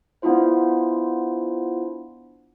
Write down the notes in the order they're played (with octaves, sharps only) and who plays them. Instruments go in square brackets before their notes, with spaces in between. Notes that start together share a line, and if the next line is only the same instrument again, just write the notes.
[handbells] B3 D4 E4 F4 C5